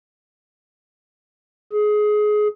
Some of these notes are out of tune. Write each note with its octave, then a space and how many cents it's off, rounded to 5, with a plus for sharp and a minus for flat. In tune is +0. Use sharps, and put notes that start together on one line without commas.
G#4 +20